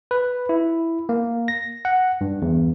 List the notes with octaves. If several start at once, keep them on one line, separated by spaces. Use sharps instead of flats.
B4
E4
A#3
A#6
F#5
G2
E2